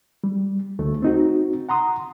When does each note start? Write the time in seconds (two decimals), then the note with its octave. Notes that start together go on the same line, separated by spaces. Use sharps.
0.24 G3
0.79 D2 A3
1.02 C4 D#4 F#4
1.69 F#5 A#5 C6 D#6